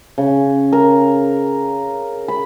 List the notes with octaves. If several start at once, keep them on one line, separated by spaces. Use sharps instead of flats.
C#3
A#4
B5